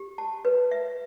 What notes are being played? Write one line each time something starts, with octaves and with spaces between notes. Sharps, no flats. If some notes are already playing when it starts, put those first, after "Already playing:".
Already playing: G4
A5
B4
E5